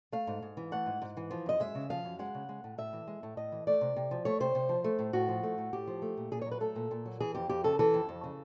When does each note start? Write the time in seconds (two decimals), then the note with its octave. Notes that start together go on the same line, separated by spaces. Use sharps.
0.12 A3 F5
0.27 G#2
0.42 G#2
0.57 E3
0.72 A3 F#5
0.86 G#2
1.02 G#2
1.17 E3
1.31 F3
1.46 F#2 D#5
1.60 G#3 E5
1.75 C#3
1.90 F3 F5
2.05 F#2
2.19 G#3 F#5
2.35 C#3
2.49 G#3
2.64 A2
2.78 A2 E5
2.93 E3
3.07 G#3
3.23 A2
3.37 A2 D#5
3.52 E3
3.67 A3 D5
3.81 C3
3.96 C3
4.11 F3
4.25 A3 C#5
4.40 C3 C5
4.55 C3
4.69 F3
4.84 A3
4.99 A2
5.13 A2 F#4
5.28 F3
5.43 A3
5.58 A2
5.73 A2 G4
5.87 F3
6.02 A3
6.17 A#2
6.31 A#2 G#4
6.42 F#3 C#5
6.51 B4
6.60 A3 A4
6.76 A#2
6.91 A#2
7.06 F#3
7.20 E3 G#4
7.35 F2 G4
7.49 F2 G4
7.64 C#3 A4
7.79 E3 A4
7.94 F2
8.09 F2
8.24 C#3